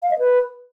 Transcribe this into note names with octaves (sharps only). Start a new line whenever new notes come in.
F5
D#5
B4